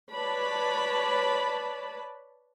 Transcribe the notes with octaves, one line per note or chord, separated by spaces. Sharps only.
B4 C#5 D5 A5 B5